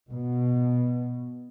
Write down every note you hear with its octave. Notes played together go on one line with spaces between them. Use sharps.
B2